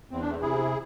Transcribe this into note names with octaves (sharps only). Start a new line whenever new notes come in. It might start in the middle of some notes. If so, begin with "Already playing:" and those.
E2 C4
D4
A3 C4
C3 E4 G#4